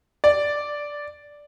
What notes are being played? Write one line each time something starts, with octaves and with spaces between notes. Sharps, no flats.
D5